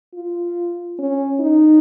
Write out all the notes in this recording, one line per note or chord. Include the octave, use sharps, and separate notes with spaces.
F4
C#4
D#4